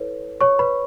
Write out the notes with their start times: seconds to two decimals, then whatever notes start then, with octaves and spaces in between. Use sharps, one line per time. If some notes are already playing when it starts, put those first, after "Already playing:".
Already playing: E4 A4 B4 C#5
0.41 C#5 C#6
0.59 B4 B5